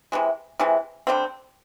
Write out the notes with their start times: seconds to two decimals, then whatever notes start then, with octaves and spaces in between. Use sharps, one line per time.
0.12 C3 E3 G#3
0.60 C3 E3 G#3
1.07 D3 G3 C4